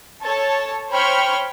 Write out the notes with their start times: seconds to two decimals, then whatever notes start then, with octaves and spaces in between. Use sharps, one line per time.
0.22 A4 C#5 A5
0.91 C5 C#5 G5 B5 C#6 F6